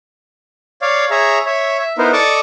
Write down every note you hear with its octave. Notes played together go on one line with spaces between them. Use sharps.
C#5 D5 F5
G#4 C#5 E5 A#5
C#5 E5
E5
B3 D#4 E4 A#4 C5
A4 D5 D#5 A5 C#6 D6